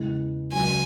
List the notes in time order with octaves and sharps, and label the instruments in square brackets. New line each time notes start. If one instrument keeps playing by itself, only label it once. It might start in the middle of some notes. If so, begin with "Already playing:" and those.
Already playing: [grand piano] E2 C#3 E3 G#3
[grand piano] C#2 C#3 F#3 [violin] G#5